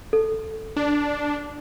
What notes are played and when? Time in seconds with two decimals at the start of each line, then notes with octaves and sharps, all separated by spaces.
0.13 A4
0.76 D4